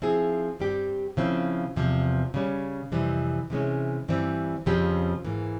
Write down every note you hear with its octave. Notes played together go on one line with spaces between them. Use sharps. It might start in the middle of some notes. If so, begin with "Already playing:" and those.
F3 C4 E4 G#4
G2 G3 C4 G4
C#3 F3 C4 E4
E2 C3 F3
C#3 G3 C#4
F2 C3 E3 G3 C4
C3 E3 G#3 C#4
G2 E3 G3 C4
F2 C#3 F3 C4 G4
G#2 E3 A#3